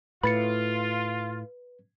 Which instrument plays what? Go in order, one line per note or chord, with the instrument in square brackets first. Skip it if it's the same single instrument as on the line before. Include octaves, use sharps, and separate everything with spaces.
[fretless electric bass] A2 [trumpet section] F4 [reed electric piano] B4 [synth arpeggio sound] B5 A6 C#7